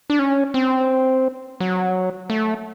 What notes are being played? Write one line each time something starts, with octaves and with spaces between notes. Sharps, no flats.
D4
C#4
C4
F#3
A3